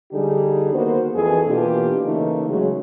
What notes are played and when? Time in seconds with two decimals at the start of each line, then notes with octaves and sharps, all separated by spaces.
0.12 D3 G3 D#4 G4 G#4
0.72 D#3 A#3 B3 F#4 C5
1.14 F2 E3 G#4 A4
1.46 B2 E3 A#3 D4 F4 G4
2.04 C#3 E3 A3 A#3 D#4
2.48 C#3 F#3 G#3 F#4 G#4